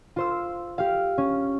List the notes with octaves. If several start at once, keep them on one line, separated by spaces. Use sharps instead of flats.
F4 C5 E6
G4 F5
C#4